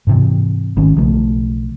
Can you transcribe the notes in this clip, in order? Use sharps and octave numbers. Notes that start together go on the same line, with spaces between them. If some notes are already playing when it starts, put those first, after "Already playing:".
G#2 C3 E3
G#1 D#3 C#4
B1 C#3 F3 A3